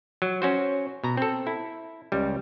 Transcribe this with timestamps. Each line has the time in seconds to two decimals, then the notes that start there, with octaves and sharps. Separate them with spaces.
0.22 F#3
0.42 C#4 F#4 C5
1.04 B2 A#5
1.17 C4 A4
1.47 E4
2.12 C#2 G3